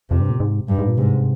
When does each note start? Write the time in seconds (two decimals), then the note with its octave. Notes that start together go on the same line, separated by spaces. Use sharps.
0.10 F2 C3
0.20 G2
0.30 A#2
0.40 G#2
0.68 G2
0.79 G#2
0.88 A#2
0.98 G#2 C3